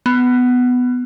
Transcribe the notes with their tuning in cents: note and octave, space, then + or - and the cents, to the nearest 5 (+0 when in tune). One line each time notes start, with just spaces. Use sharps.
B3 +10